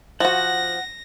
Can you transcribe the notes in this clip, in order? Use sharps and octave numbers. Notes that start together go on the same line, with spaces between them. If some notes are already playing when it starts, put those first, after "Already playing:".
F3 F#4 F#5 A#6